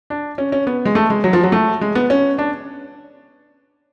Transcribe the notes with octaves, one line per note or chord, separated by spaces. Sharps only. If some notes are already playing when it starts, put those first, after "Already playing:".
D4
C#4
C#4
B3
G#3
A3
G#3
F#3
F3
F#3
A3
G#3
B3
C#4
D4